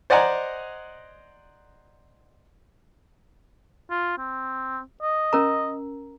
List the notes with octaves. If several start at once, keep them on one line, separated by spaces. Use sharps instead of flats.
C5 D5 D#5 F#5 G#5 A#5
F4
C4
D#5
C#4 A#4 A#5